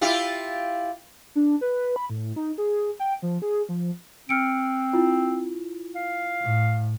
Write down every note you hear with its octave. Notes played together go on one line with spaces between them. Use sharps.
E4 F4 G4
D4
B4
B5
A2
D#4
G#4
G5
F3
G#4
F3
C4 F6 C#7 D7
E4 F4
F5
A2